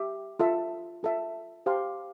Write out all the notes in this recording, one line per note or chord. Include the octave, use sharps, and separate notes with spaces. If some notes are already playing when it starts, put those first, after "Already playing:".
Already playing: G4 E5
F4 A4 E5
F4 A4 E5
G4 C5 F5 A5 C6